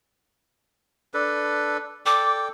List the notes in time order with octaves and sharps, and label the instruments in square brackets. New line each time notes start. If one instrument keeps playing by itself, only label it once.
[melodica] D4 A4 B4
[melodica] A4 D5 G5 [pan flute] D6